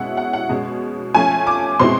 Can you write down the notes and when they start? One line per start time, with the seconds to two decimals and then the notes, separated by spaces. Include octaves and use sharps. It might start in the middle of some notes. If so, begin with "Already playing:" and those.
Already playing: B2 G#3 C#4 E4 F#5
0.17 F#5
0.33 F#5
0.49 B2 G#3 C#4
1.14 F3 A3 C#4 F4 G#5
1.47 D6
1.80 B2 G#3 C4 E4 C6